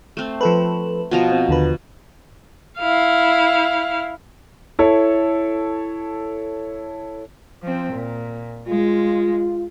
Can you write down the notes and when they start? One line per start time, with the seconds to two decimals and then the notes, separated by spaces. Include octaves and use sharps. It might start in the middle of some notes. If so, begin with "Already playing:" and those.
0.17 A3 C4
0.41 F3 A4 B4
1.11 B2 F3 A#5
1.32 C4
1.48 D#2 D3 B4
2.79 E4 F5
4.79 E4 A4 C#5
7.62 F3 C4
7.93 A#2
8.67 G#3 F4